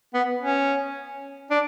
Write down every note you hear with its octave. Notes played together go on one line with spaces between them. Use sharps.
B3
C#4
D4